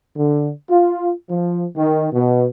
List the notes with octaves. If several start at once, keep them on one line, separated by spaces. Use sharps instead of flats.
D3
F4
F3
D#3
B2